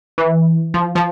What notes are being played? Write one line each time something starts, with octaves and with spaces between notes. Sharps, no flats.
E3
F3
F3